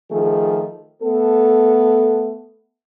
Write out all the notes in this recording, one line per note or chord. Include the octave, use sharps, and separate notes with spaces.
D#3 F3 A3 G#4
A3 B3 A4